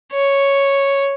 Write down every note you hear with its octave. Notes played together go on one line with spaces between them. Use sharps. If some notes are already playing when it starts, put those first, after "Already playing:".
C#5